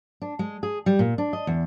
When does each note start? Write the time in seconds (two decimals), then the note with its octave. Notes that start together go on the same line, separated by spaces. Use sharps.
0.22 D4
0.39 G#3
0.63 G#4
0.86 G3
0.99 A#2
1.18 D4
1.33 D#5
1.47 E2